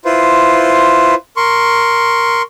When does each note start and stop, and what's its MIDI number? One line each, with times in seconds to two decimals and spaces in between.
0.05 1.15 64
0.05 1.15 65
0.05 1.15 71
0.05 1.15 72
1.37 2.42 70
1.37 2.42 84
1.37 2.42 85